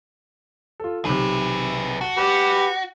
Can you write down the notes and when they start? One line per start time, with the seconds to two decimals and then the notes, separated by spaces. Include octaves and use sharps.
0.80 F4 A4
1.05 B1 C3 G#4 B4
2.01 F#4 A5 G7
2.18 G4 B4 F#6